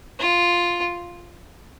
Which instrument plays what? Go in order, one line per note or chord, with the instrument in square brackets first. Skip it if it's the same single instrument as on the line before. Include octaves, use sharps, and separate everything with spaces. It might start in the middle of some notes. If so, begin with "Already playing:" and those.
[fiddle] F4